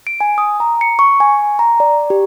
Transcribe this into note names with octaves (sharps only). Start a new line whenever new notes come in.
D7
G#5
D#6
A#5
C#7
C#6
G#5
A#5
D5
G4